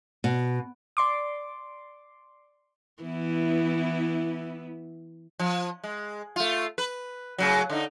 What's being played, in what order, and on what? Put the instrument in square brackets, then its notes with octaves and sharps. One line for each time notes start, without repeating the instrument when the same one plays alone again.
[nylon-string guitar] B2
[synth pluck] D5 C6 D6
[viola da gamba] E3 [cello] B3 E4
[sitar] F3
G#3
A3 F4
B4
A2 C#3 F#3
D3 D#4